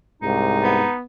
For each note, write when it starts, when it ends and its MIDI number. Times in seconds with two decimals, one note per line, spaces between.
0.22 0.80 36
0.22 0.86 44
0.22 0.92 63
0.63 1.02 59